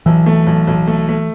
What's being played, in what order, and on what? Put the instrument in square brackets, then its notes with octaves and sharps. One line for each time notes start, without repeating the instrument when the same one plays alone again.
[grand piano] B1 [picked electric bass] E3
[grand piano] A3
B1
B1
A3
A3